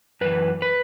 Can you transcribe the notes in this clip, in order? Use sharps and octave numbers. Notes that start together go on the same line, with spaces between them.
F#2 E3 B4
B4